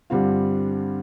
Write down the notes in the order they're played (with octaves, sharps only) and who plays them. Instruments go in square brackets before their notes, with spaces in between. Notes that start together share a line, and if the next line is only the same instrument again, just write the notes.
[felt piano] G2 D3 G3 C4 F4